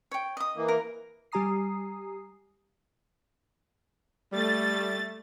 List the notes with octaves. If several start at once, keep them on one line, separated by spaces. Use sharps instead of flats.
C#5 G5
D#5 D#6
E3 A#3
A#4
G3 G4 G#5 A#5 D#6 C7
G3 A3 A6